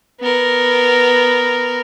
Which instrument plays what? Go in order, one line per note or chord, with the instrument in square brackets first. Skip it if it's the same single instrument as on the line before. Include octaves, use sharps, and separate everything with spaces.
[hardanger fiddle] B3 A#4